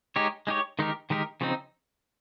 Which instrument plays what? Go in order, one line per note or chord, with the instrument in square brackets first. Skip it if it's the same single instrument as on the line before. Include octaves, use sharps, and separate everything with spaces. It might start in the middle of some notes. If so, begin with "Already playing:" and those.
[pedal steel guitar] G#3 D#4 G4 C#5
G#3 D#4 G4 C#5
D#3 G#3 D#4 G4 A#4
D#3 G#3 D#4 G4 A#4
C#3 F3 C4 D#4